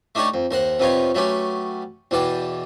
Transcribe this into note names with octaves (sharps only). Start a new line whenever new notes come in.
A3 D4 D#4 G4 C#5 D5
F2
D#2 A#4 C5 F#5
F2 C3 B3 D#4 F4 C#5
F#3 A3 B3 C#4 G4
E2 B2 E3 D5 G5